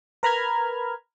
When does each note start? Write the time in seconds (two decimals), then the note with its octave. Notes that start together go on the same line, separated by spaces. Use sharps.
0.23 A#4 B4 A#5 B5 F6 G#6